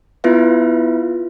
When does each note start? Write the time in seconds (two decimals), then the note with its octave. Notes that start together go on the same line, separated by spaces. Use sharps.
0.24 B3 E4 F4 B4 E5 F5